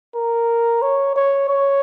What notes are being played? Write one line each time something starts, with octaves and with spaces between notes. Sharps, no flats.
A#4
C#5
C#5
C#5